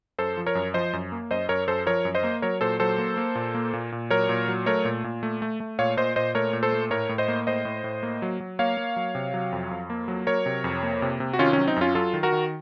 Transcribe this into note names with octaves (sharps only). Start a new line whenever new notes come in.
F#2 A4 C5
F3
A#4 C#5
F#2
F3 C5 D#5
F#2
A#3
F#2 C5 D#5
F#2 A#4 C#5
F#2 A4 C5
F3 A#4 C#5
F#2
C5 D#5
A#3
F#3 A#4 C#5
A#2 A4 C5
F#3 A4 C5
A#3
A#3
A#2
A#3
A#2
A#2
F#3 A#4 C#5
A#2
F#3
A3 A#4 C#5
A#2
A#2
A3
A3
A3
A#2 C#5 F5
A#2 C5 D#5
A#2 C5 D#5
A3 A#4 C#5
A#2
A4 C5
A3
A2 A#4 C#5
A2
C5 D#5
A#3
A2 C5 D#5
A2
A2
A#3
F#3
F#3
A#3 C#5 F5
A#3
F#3
C3
F#3
F2
F2
A#3
F#3
F#3 A#4 C#5
C3
F2
A#3
C3
C3
F#4
D#3 C#4 F4
F#3 C#4
C4 D#4
F#2 C#4 F4
F#3 F4 A4
D#3
F#4 A#4
D#3